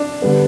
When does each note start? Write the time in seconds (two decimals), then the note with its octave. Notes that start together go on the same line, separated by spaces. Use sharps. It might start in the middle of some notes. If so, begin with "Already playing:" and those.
Already playing: D4
0.22 D3 G3 B3